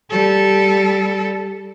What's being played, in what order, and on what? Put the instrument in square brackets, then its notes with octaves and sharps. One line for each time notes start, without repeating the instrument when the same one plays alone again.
[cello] G3 A4